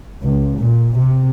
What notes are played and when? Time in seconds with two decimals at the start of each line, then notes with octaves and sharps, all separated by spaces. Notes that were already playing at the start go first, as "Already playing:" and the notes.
0.23 C#2
0.57 A#2
0.98 C3